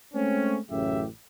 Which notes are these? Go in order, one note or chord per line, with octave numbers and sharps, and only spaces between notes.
G#3 A3 C4 C#4
A1 F#2 A2 C#3 G4 E5